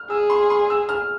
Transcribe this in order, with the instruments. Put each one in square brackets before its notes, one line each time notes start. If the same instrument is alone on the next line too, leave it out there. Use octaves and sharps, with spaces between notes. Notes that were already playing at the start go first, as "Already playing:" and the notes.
Already playing: [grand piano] F6
[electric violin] G#4 [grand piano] E6
[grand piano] C6
C6
E6
F6